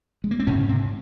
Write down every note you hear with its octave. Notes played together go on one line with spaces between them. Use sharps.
G#3
A#3
C4
G#2 C#3 C#4
C3 C4